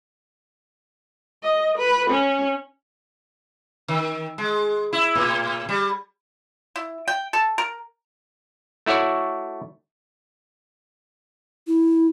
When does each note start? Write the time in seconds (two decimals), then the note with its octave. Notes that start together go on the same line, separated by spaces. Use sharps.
1.44 D#5
1.78 B4
2.10 C#4
3.88 D#3
4.38 G#3
4.93 E4
5.15 A2
5.69 G3
6.76 E4
7.08 G5
7.33 A4
7.58 A#4
8.86 A3 E4 F#4 C#5 D5
11.68 E4